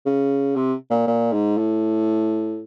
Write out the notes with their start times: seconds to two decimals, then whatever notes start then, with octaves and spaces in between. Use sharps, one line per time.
0.06 C#3
0.56 C3
0.90 A#2
1.07 A#2
1.33 G#2
1.57 A2